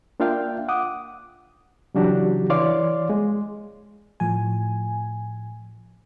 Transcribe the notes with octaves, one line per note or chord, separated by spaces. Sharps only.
A#3 D4 F4 E5 F5 G5
F#5 D6 D#6
C#3 E3 F#3 D4 F#4 G4
E3 C#5 D5 F5 C6 D6
G#3
A2 F3 G#5